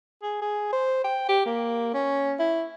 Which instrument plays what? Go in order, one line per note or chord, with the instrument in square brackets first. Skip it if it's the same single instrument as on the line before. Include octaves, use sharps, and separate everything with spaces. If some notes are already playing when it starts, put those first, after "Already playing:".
[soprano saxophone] G#4
G#4
C5
G5
G4
A#3
C#4
E4